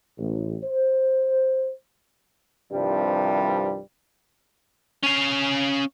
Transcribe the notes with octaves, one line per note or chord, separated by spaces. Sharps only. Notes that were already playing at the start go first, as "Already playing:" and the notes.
A1
C5
C2 G2 C3 D#3 F3 G3
C#4 F5